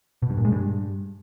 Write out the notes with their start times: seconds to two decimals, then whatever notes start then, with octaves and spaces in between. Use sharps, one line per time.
0.22 B2
0.30 G2
0.37 A#2
0.45 G#3
0.52 G2